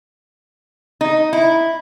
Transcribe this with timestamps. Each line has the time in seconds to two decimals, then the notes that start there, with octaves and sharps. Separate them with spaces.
1.01 D#4
1.33 E4